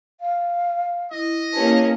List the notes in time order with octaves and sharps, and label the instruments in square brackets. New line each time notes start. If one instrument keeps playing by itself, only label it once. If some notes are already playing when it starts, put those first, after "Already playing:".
[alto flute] F5
[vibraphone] E4 [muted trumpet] D#5
[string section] A#3 C#4 [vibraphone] E4 G4 B4 [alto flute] A5